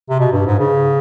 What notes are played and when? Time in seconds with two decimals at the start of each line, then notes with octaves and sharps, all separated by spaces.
0.09 C3
0.20 B2
0.32 G2
0.47 G#2
0.59 C#3